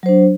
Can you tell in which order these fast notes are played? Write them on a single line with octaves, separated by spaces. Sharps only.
F#3 C5 D4